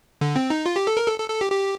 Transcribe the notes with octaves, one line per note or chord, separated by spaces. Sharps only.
D3
C4
D#4
F4
G4
A4
A#4
A4
A4
A4
G4
G4